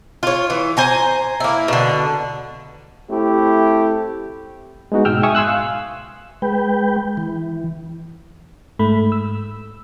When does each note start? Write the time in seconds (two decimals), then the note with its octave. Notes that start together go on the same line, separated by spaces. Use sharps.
0.23 F4 C#5
0.50 E3
0.77 C5 G#5 A#5
1.40 A#3 E4
1.68 B2 D3
3.09 A3 C4 E4 G4
4.92 G#3 B3 D#4 F#4
5.05 G#2 B2 G5 E6 F6
5.23 E5 G#5 C#6 D#6 E6
5.35 G#5 C6 E6 F#6
5.47 F5
6.42 G#3 B4 G5
7.17 E3
8.79 G#2 A3 B5
9.12 E6